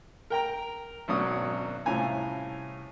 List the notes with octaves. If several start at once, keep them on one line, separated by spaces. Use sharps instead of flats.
A#4 G5 A#5
G#1 F#2 B2 F#3 D4 D#6
C2 A2 C#4 F4 G#5 A#5